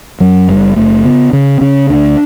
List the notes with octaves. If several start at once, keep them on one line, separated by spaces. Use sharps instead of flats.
F#2 F#3
F#1 G3
F#1 A3
C#3 B3
C#3 C#4
C#3 C#4
D2 D4